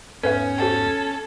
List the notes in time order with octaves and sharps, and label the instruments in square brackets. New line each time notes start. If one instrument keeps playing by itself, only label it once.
[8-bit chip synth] E2 G#2 B3 [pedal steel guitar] C#4 [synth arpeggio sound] A4 B4 E5
[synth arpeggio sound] F#4 C5 F#5 [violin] A4